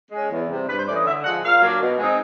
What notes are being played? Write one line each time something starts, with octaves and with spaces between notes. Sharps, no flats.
G#3 C#4
E2
C3 E3 G3 C4
G2 B4
C5
E3 A3 C#4 D5
D#5
D3 E5
F3 G#3 F#5
A#2 F5
F#3 A#3 D4
B2
G#3 C4 D#4